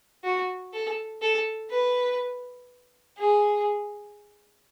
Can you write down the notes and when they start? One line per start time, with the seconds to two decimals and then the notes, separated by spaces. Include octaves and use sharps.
0.24 F#4
0.73 A4
1.22 A4
1.70 B4
3.18 G#4